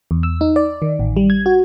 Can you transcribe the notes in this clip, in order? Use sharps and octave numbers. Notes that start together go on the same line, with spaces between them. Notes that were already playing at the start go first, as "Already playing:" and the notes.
E2
E6
D#4
D5
D#3
A1
G3
G#6
F#4